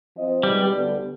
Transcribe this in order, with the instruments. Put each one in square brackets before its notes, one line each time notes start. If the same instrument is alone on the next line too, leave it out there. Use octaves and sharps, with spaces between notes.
[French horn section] F3 C4 F4 C5 D#5
[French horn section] B2 G#3 C4 D#4 B4 [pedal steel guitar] G3
[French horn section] D2 D3 G3 B3 D4